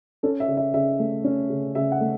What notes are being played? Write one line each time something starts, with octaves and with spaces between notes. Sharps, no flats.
C#4 A4
E5
C#3
E5
C#3 E5
A3
C#4
C#3
C#3 E5
F#5
A3